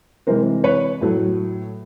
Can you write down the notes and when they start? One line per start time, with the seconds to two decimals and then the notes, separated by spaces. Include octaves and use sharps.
0.27 C3 E3 G#3 A#4 C5
0.64 B4 C#5
1.01 A2 F#3 A3